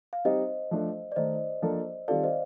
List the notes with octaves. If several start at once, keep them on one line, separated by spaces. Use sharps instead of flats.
F5
G3 C4 D#4 G4 C5 D#5
F3 A3 D4 A4
D5
D#3 A3 D#4 C5 D#5
F3 A#3 D4 A4
D#3 G3 C4 F4 A4 D5 F5
C5 D#5